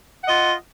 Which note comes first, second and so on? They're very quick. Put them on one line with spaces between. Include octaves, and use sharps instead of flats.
F#5 D#5 F4